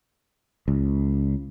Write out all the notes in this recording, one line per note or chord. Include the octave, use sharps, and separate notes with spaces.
C#2